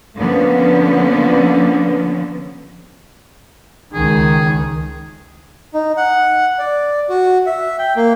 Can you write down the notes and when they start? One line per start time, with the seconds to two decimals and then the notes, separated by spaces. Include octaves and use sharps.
0.15 D3 F3 A#3 B3 C#4
3.94 C#2 D#3 G#4
5.74 D#4
5.97 F#5
6.59 D5
7.09 F#4
7.46 E5
7.79 G5
7.97 A#3